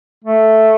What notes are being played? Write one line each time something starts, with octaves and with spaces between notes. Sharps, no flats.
A3